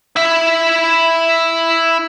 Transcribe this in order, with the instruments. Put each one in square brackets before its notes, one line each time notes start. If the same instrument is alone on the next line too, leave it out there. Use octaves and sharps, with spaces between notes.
[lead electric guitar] E4 E5